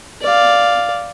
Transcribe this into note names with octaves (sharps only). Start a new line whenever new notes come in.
D5 F5